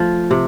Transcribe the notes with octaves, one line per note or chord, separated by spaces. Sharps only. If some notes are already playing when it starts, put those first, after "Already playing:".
Already playing: F3 A3
C3